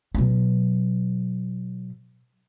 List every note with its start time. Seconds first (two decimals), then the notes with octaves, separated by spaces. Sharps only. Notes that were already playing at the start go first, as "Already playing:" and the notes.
0.15 B2 F#3